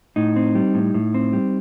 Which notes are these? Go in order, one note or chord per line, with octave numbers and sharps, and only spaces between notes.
A2 D#4
C4
G3
A2
A2
C4
G3